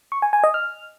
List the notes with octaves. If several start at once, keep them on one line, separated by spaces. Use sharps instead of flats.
C#6
G#5
G#5
D#5
F6